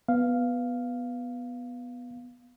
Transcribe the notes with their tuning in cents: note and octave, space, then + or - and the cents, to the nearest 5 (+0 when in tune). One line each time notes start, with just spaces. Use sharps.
B3 +0 F5 +0